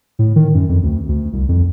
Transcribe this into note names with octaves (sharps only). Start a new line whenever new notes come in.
A2
D#3
F#2
F2
D2
D2
C2
F2